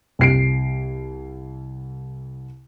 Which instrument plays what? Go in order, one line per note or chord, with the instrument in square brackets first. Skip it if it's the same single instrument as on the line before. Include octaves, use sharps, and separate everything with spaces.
[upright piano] C2 C7 D7